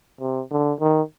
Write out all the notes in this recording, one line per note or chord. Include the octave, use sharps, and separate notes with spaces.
C3
D3
D#3